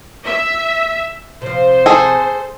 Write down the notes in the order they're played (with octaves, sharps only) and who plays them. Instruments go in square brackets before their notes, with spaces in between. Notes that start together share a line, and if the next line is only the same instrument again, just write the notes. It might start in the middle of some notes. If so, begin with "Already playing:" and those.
[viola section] E5
[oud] C3 F3 [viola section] C5
[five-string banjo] G#4 A4